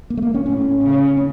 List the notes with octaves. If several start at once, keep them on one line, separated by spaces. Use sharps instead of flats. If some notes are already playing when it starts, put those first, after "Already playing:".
A#3
A3
A#3
C#4
A2 C#4
C#3
C#4